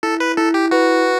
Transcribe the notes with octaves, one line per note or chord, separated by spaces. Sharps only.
E4 A4
B4
E4 A4
G4
F#4 B4